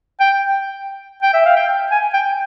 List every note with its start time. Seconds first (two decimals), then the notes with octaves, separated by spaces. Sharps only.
0.20 G5
1.23 G5
1.34 E5
1.46 F5
1.56 G5
1.91 G#5
2.14 G5